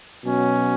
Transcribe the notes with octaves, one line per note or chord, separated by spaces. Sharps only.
B2 F#3 C#4